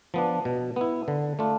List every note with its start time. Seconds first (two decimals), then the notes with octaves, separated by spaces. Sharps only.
0.14 F3 B3 D4
0.45 B2
0.76 B3 E4
1.08 D3
1.39 A3 D4 F4